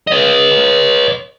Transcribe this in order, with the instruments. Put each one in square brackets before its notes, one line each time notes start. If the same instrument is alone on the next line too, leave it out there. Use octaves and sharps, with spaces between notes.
[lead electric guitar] C#5 D#5